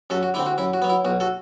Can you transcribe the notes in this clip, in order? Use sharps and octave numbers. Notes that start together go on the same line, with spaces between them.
F#2 F#4 A4
F#4
D3 A3 C4 E4
F#4
F#2 E4
F#4
F#3 B3
E4
B1 F#4
F#4 A4